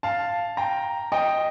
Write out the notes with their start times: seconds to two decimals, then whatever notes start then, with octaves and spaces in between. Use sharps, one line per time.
0.03 F5 A5
0.57 G5 A#5
1.12 D#5 G5